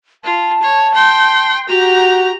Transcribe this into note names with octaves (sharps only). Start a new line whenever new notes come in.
F4 A5
C#5
G5 C6
F#4 G4 A#5